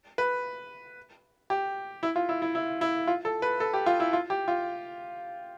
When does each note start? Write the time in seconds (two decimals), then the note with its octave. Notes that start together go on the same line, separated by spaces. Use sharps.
0.18 B4
1.50 G4
2.03 E4
2.16 F4
2.29 E4
2.42 E4
2.55 E4
2.81 E4
3.07 F4
3.25 A4
3.42 B4
3.60 A4
3.74 G4
3.86 F4
4.00 E4
4.13 F4
4.30 G4
4.48 F4